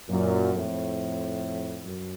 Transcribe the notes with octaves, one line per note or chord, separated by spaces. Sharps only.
F#2 A#2
F2 A2
F#2